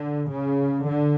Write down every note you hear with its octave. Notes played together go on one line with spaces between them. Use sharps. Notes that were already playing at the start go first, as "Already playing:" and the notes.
Already playing: D3
C#3
D3